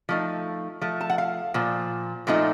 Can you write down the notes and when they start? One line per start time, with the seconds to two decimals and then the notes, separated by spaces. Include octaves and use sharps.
0.09 F3 A3 D#4
0.81 F3 A3
1.01 A5
1.10 F#5
1.18 F5
1.54 A#2 F3
2.27 A#2 F3 A3 D#4